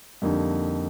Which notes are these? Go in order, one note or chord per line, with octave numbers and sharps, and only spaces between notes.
F2 D3 G3 A#3 D#4